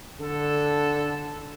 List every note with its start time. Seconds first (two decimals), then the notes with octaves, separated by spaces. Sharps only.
0.19 D3 A4